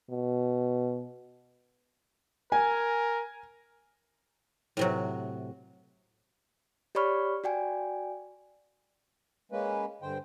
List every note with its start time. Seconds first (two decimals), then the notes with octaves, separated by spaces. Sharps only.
0.10 B2
2.52 A#4 G#5
4.77 A2 C3 F#3
6.95 G4 C#5 D5 B5 C#6 F6
7.44 F#4 D5 G5 G#5
9.52 G#3 A#3 C#4 B4
10.02 G2 D3 C5 G5